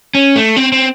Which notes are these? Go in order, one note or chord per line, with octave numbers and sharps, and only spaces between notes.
C#4
A3
C4
C4